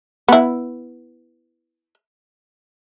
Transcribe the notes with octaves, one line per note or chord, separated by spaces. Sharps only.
B3 E4